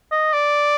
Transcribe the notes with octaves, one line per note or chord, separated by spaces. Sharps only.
D#5
D5